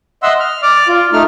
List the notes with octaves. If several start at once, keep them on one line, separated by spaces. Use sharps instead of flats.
D#5 E5 F#5 C6 E6
F6
D5 D6 F6
F4
A3 D#4 F6